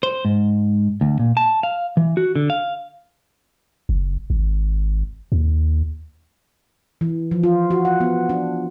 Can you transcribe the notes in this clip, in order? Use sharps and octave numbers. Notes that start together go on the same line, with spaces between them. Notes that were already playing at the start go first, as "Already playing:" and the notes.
C5
G#2
D2
A#2
A5
F5
E3
F#4
D3
F5
F#1
G#1
D#2
E3
F3
F4
F#4
F#5
B3
D4